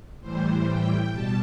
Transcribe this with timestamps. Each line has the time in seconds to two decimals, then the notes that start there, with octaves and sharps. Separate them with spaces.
0.20 A2 E3 G3 C5
0.66 G5
1.11 B2 G3 A5